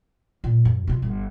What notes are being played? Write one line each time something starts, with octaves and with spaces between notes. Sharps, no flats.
A#2
F#2
B2 F4
G1